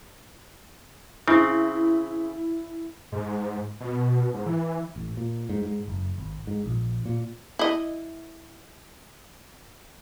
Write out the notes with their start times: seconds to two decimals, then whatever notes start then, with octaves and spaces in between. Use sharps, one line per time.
1.28 C#3 C4 E4
3.12 G#2
3.81 B2
4.34 G#2
4.46 E3
4.96 A1
5.17 A#2
5.49 G#2
5.63 G#2
5.88 F#1
6.18 G#1
6.47 G#2
6.66 A#1
7.06 A#2
7.59 E4 D#5